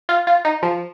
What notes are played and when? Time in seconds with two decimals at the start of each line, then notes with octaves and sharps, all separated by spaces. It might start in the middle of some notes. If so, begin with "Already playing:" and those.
0.09 F4
0.27 F4
0.45 D#4
0.63 F3